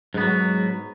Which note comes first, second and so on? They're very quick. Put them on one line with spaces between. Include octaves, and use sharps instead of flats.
G#2 B3 F#3